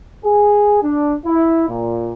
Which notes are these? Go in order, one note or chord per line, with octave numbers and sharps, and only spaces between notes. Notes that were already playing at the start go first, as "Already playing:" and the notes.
G#4
D4
E4
A#2